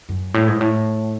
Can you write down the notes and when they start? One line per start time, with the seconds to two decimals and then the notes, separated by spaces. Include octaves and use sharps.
0.09 F#2
0.34 A2
0.48 G#2
0.61 A2